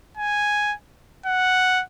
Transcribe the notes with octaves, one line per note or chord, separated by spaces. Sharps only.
G#5
F#5